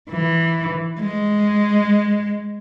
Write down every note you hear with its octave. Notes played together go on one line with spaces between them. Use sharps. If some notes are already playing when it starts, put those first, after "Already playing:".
E3
G#3